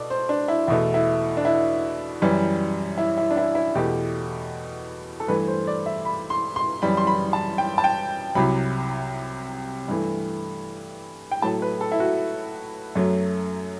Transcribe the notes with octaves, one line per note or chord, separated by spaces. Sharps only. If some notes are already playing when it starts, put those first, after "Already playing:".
Already playing: B2 A4 D5
C5
D4
E4
E2 B2 A3 E4
E4
D4
E4
F#2 E3 G3
E4
E4
D4
E4
E4
E2 B2 A3 G4
A4
G2 E3 A3 B4
C5
D5
E5
B5
C6
C6
F#2 E3 G3 B5
C6
B5
A5
G5
A5
G5
C2 C3 F#3 B5
G2 E3 A3
G5
A2 F#3 A3 A5
B4
A4
E4
F#4
F#2 F#3 A3